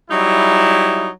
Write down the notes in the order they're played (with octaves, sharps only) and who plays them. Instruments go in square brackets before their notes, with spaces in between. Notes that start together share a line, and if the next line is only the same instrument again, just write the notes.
[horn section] F#3 G3 D#4 E4